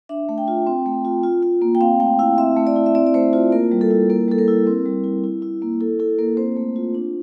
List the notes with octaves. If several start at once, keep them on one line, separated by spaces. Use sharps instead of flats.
D4 E5
A3
G5
F4
C4
A3
F4
F4
F4
A#3
G5
C4 F5
A3 G5
E4 F5
C4 E5
A3
D5
E4
E5
C4 D5
D5
A3 C5
F4 C5
A#3 A#4
G3
A4
E4
A#3 A#4
G3 A4
A#4
E4
C4
G3
E4
E4
E4
A#3
E4 A4
E4 A4
A#3 A#4
C4 C5
A3
F4
D4